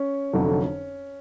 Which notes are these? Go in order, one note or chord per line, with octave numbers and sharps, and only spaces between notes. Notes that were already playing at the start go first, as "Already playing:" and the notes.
Already playing: C#4
F1 F2 D3 F#3